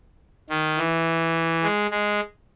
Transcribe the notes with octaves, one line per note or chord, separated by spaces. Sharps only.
D#3
E3
G#3
G#3